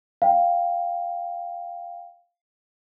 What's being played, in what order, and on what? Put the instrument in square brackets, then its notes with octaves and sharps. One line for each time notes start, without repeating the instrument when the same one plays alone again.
[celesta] F5 G5